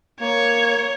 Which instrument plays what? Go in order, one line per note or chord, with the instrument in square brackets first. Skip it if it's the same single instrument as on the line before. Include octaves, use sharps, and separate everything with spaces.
[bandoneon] A#3 [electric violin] C#5